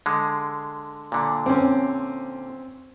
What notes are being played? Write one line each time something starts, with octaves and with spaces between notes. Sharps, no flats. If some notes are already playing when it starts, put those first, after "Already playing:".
D3 G#3
A#2 D3
C4 C#4